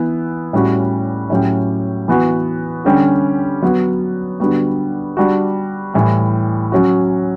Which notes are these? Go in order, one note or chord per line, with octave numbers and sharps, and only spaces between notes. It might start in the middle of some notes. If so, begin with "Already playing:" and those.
Already playing: E3 B3 E4
A2 G3 C#4 F#4
A2 F#3 C#4 G4
E3 B3 F#4
D3 G3 C#4 G4
F#3 B3 F#4
D3 G3 B3 F#4
G3 D4 F#4
A2 E3 G3
F#3 C#4 F#4